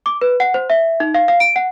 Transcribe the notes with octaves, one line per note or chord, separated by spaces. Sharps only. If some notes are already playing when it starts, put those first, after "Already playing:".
D6
B4
F#5
C5
E5
D#4
F5
F5
D7
F#5